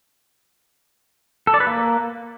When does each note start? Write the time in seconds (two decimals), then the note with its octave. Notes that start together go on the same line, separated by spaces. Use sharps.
1.47 A4
1.54 D5
1.60 B4
1.67 A#3